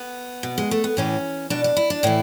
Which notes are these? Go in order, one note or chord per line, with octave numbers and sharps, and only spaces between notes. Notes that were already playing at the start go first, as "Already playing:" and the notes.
Already playing: B3
B2
G#3
A3
B3
A2 E3 C#4
B2 D4
D4
E4
D4
A2 E3 E4